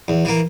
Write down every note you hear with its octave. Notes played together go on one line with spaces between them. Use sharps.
E2
E3 A#3